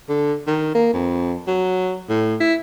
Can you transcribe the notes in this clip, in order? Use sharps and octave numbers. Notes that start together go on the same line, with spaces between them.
D3
D#3
A#3
F2
F#3
A2
E4